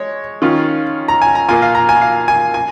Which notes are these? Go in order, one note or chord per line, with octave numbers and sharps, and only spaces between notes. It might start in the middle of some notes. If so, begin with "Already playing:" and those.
Already playing: G#3 C#5
D#3 C#4 F4
A#5
G#5
A#5
A#2 A#3 F4 G#5
F5
A#5
G#5
F5
G#5
G#5